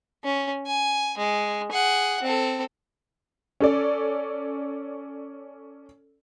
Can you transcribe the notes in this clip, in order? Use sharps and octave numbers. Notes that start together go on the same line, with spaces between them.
C#4
G#5
G#3
G#4 F#5
C4 A4
C#4 A4 D5